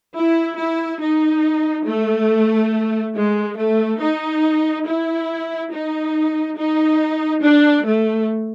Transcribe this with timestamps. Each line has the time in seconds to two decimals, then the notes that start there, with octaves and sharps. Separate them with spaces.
0.15 E4
0.57 E4
1.01 D#4
1.85 A3
3.15 G#3
3.56 A3
4.00 D#4
4.85 E4
5.71 D#4
6.56 D#4
7.42 D4
7.85 A3